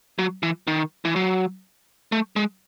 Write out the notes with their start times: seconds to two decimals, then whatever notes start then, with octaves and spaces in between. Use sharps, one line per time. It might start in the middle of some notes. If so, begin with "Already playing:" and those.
0.19 F#3
0.43 E3
0.67 D#3
1.05 E3
1.16 F#3
2.12 A3
2.36 G#3